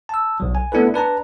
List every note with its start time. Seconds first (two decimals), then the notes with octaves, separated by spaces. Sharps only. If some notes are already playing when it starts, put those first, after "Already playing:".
0.09 A5 E6
0.40 B1 F#3
0.55 G#5
0.72 A3 B3 D4 E4 A4 B4
0.94 D4 B4 A5 A#5